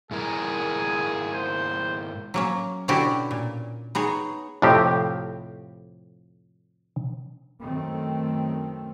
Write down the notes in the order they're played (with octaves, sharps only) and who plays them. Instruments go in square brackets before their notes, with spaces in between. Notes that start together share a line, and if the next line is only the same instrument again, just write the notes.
[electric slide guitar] G#2 E4 A#4 [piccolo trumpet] G#4
[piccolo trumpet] C5
[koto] F#3 A#3 C#4
B2 D3 C#4 E4 F#4 G4
A#2
B3 D#4 G#4 C#5
[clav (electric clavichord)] F2 A2 C3 F3 C4 G4
[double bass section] F#2 D#3 A3 C4